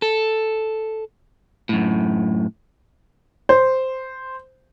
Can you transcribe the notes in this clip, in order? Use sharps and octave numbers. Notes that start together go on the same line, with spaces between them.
A4
F#2 A2
C5